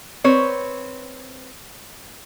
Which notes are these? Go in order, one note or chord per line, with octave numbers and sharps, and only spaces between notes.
C4 B4 C#5